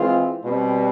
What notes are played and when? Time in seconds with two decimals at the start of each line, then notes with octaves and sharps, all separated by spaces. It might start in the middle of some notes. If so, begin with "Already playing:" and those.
Already playing: E3 G#3 C4 F4 G#4
0.43 B2 G3 C4